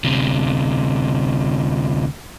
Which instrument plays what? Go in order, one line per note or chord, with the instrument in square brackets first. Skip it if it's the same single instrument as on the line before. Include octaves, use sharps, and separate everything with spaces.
[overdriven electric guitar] D2 C3